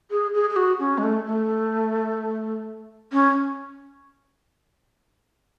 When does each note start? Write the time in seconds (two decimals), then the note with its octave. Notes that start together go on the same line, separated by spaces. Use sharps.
0.11 G#4
0.34 G#4
0.50 G#4
0.56 F#4
0.79 C#4
0.98 G#3
1.03 A3
1.26 A3
3.13 C#4